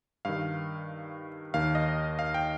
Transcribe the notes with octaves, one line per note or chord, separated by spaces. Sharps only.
G2 D#3 F5
D#2 D#3 F5
D#5
F5
G5